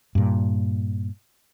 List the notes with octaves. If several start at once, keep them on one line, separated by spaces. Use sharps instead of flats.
G2 A#2